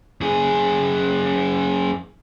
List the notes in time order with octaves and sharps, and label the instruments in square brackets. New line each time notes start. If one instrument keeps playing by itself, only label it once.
[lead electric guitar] F#2 G#4